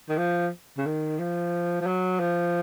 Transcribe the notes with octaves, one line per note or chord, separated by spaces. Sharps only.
D#3
F3
C#3
D#3
F3
F3
F#3
F3